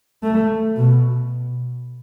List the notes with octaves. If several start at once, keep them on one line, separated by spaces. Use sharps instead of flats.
A3
B2